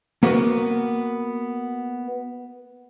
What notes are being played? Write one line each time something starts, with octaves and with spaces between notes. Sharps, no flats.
A#3 B3 F#4 G4 A#4 B4